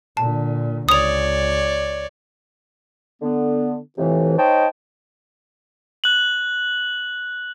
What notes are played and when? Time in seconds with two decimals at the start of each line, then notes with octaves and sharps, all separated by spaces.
0.17 A#2 D3 A5
0.89 C#2 C#5 D5 D#6 F7
3.22 D3 B3
3.98 F2 A2 C3 E3
4.38 D#4 C5 C#5 D#5 G5 A5
6.04 F#6 F#7